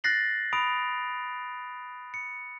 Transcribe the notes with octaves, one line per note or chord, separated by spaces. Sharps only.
F#6 A6 A#6 C7 F#7
B5 D#6 D7 F7
C#7